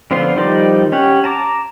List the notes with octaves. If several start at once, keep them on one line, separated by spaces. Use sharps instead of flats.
D3 F3 B3 F4 C6
D#3 F3 G3 D#4 D5
C#4 G4 C#5 F#5
A5 A#5 D6